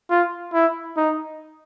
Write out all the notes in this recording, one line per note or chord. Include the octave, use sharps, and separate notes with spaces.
F4
E4
D#4